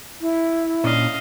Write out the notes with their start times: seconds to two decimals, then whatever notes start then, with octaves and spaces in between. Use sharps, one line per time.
0.21 E4
0.84 A#2 C#4 D4 D#5 F5